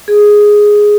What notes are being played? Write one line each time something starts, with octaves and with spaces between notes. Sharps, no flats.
G#4